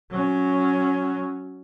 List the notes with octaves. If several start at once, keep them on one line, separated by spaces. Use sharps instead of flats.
F#3 C#4